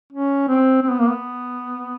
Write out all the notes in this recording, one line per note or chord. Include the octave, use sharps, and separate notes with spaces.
C#4
C4
C4
B3
A#3
B3